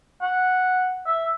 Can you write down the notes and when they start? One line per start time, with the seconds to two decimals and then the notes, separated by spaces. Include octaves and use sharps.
0.21 F#5
1.07 E5